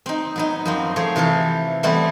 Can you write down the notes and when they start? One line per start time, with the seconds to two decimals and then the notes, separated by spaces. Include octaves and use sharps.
0.06 C4 D#4
0.36 F#3 B3 D#4
0.65 F#2 F3 C4
0.96 F3 A3 G#4 C5 C#5
1.16 C3 E3 A4 F5
1.83 E3 G3 A3 B3 C4 E4